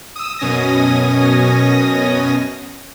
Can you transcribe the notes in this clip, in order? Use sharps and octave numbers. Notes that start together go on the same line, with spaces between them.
D#6 E6
F#2 B2 C#4 G#5 D#6 A#6